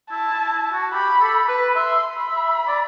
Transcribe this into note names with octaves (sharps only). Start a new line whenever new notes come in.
E4 A5
E4
E4
F#4
G4 B5
A4
B4
E5 C6
B5
E5
D5